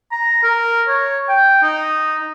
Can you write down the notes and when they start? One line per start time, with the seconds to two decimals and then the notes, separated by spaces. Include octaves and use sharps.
0.12 A#5
0.43 A#4
0.88 C#5
1.29 G5
1.62 D#4